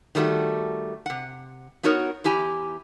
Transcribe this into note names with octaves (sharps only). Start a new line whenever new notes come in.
D#3 G3 A3 D#4 F#4
C3 F#5
B3 D#4 F#4 A#4 C#5
E2 E4 G4 G#5 A#5